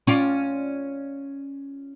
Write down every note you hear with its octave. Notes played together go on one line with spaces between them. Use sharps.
C#4 F4 D5